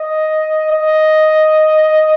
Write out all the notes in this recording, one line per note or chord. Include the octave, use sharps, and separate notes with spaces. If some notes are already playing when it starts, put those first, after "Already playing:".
Already playing: D#5
D#5